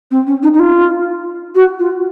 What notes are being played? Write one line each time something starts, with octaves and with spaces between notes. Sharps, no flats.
C4
C#4
D#4
D#4
F4
F#4
F4